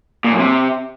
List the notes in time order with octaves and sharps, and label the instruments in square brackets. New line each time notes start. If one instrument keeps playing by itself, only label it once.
[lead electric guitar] A#2
F#2
C3